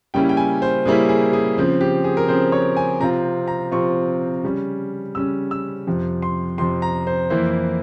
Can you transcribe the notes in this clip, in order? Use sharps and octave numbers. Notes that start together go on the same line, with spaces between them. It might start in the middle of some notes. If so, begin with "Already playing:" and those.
C#3 G3 A#3 C#4 E4 G5
G5
G#5
C5
C#3 G3 A#3 C#4 E4 G#4
G#4
G#4
C#3 F3 C4
G4
G#4
A#4
C#3 F3 C4 C5
C#5
G#5
C3 F3 C4 F4 A#5
A#5
C3 F3 C4 F4 C#6
C#3 G3 C#4
C#3 G3 C#4 E6
E6
F2 C3 F3
C6
F2 C3 F3 C6
A#5
C5
F2 E3 A#3 E4 C5